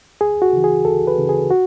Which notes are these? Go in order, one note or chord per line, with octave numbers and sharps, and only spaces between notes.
D2 G#4
F#4
C#3 E3
G#4
D2 A4
B4
C#3 E3
G#4
F#4